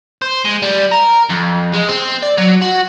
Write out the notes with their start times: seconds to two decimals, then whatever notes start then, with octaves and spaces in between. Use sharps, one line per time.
0.22 C5
0.45 G#3
0.62 G3
0.92 A#4
1.30 F2
1.73 G#3
1.89 C4
2.22 D5
2.38 F#3
2.61 F#4